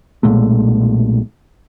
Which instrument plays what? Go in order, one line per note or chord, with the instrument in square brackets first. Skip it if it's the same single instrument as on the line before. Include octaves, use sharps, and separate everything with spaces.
[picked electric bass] B1 A#2 G#3 A3